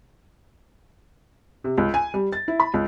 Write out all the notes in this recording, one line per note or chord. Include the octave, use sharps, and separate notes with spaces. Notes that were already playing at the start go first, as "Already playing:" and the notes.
C3
C#2
G#5
G3
A6
E4
B5
C#2